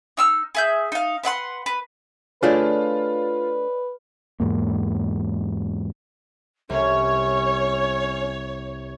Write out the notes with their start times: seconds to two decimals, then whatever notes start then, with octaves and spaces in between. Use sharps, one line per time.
0.17 D#4 E6 F6
0.55 G#4 E5 G6
0.92 D#4 F5
1.23 B4 E5 F#5 C6
1.66 B4
2.43 A3 D4 F4 G#4 B4 C#5 D5
4.40 E2 G#2 A#3
6.70 C2 C#4 C#5